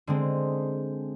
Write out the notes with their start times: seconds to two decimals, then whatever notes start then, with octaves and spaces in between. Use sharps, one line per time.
0.07 D3 G#3 C4